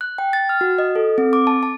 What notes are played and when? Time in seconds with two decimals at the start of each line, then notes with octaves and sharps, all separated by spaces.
0.01 F#6
0.18 G5
0.33 A6
0.49 F6
0.61 F#4
0.78 D#5
0.95 A4
1.18 C4
1.33 D6
1.47 A5
1.63 A5